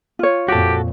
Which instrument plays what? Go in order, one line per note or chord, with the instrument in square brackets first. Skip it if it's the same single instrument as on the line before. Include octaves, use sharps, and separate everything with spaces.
[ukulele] F4 C#5
[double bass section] F2 A#2 [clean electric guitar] F#4 A4 [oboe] G4